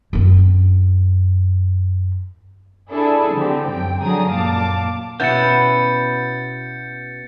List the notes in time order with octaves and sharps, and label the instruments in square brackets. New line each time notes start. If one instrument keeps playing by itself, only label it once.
[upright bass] F#2 C4
[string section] D4 E4 G#4 A4
D3 C4 G4
F#2 G5
D3 F#3 G#4 A#5 D#6
F#2 A#2 F5 A5 D6
[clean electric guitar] B2 C#4 [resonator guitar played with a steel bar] B3 E4 [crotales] G6 A6 C#7